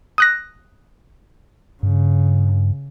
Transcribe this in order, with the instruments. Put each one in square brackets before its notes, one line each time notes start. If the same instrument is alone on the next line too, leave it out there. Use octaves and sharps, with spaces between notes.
[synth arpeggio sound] D#6 F#6 A#6
[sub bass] G2 [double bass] C#3